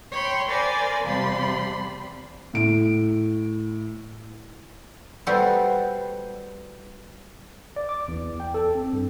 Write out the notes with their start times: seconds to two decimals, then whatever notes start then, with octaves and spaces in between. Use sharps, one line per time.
0.12 C#5 G5 B5 C6
0.49 A#4 C5 D5 G#5 B5 A6
1.03 E2 C3 F3 G3 B5 C6
2.54 A2 D7
5.27 G3 B3 F#4 A4 C5
7.76 D5
7.89 D6
8.08 E2
8.40 G5
8.54 A4
8.75 C4
8.93 G2